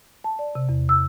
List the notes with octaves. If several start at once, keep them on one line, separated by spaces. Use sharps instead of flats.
A5
D5
C3
E2
E6